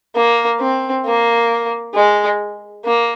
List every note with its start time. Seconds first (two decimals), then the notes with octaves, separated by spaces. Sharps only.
0.15 A#3
0.60 C4
1.05 A#3
1.94 G#3
2.85 A#3